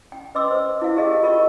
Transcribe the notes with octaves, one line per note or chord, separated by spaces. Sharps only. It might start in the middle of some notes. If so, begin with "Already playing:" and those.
G5
B4 D#5 C6 D6 E6
C5
E4 F5
G4 G#4 A#4 D#5 F5 G5
F4 A#4 D#5 C#6